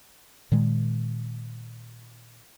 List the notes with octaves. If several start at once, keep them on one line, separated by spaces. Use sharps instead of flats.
A#2 D#3 G#3